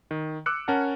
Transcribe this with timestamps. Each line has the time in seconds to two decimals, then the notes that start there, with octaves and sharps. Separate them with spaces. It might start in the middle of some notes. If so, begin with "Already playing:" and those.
0.11 D#3
0.46 D6 E6 F#6 C#7
0.68 C#4 A#4 F#5 A5